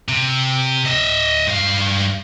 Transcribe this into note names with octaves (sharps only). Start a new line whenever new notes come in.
C3
D#5 E5
G2 F5